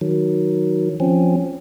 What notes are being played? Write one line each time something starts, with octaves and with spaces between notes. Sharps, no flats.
D#3 F#3
F3 C4 C#4